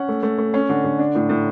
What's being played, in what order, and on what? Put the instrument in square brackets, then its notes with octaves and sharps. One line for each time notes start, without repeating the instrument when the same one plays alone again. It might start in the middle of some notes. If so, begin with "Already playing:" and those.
Already playing: [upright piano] C#4 F#5
A3
A3
A3
C#4
D3
D3
D4
A2
A2